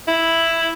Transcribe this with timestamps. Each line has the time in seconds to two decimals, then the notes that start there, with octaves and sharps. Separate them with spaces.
0.08 E4